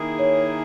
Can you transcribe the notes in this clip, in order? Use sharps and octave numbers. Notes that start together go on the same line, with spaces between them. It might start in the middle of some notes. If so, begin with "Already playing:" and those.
Already playing: D#3 A#3 E4 G#4
C#5